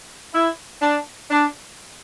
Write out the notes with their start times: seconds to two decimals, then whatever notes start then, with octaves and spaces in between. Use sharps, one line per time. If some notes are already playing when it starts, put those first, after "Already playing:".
0.33 E4
0.81 D4
1.30 D4